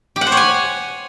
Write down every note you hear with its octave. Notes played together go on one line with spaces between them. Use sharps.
G4
F#5
C5
C#5
G#5